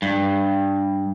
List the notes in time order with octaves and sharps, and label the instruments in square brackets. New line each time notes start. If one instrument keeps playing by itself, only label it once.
[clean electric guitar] G2